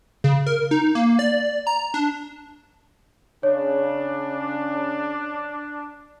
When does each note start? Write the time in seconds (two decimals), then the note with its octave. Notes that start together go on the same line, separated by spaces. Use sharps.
0.24 C#3
0.46 A#4
0.71 D#4
0.95 A#3
1.19 D5
1.67 A#5
1.94 D4
3.43 C#3 D4 C#5